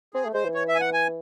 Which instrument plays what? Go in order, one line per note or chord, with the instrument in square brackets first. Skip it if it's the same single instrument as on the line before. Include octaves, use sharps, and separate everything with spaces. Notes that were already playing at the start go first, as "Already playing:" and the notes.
[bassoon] C4 [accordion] G#4
[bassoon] A3
[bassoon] G#3 [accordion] C5
[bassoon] E3
[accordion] C#5
E5
G#5
F#5
G#5